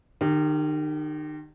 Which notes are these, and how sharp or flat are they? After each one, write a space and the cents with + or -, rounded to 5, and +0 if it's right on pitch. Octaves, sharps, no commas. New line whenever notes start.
D#3 -35 G4 +0